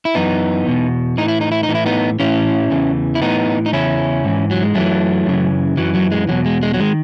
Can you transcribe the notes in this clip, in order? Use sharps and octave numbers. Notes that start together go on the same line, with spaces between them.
E4
F#2 E3 B3 D#4
E2 B2
A2 E3 D#4
E4
D#4
E4
D#4
A2 E3
E4
B3 D#4
A2 E3 C#4 E4
E2 C#3 E3
E4
A2 E3 B3 D#4
D#4
E2 C#3 C#4 E4
G#2 E3
F#3
G#3
F#2 E3 F#3 A3
F#2 C#3 E3
F#2 E3 F#3
F#3
G#3
E2 B2 F#3
G#3
G#3
F#3
D#3 G#3